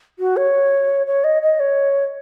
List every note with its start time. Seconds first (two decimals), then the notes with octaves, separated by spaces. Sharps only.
0.19 F#4
0.37 C#5
1.07 C#5
1.24 D#5
1.42 D#5
1.60 C#5